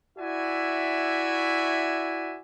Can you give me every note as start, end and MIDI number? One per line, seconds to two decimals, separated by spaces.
0.18 2.39 64
0.18 2.39 66
0.18 2.39 74
0.18 2.39 76
0.18 2.39 80